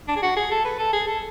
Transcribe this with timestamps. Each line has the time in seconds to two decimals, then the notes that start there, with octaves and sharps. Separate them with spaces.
0.08 D4
0.16 G#4
0.23 F#4
0.37 G#4
0.51 A4
0.65 B4
0.79 A4
0.93 G#4
1.07 A4